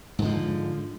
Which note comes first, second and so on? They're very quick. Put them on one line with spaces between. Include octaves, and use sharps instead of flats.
G#2 D3 F3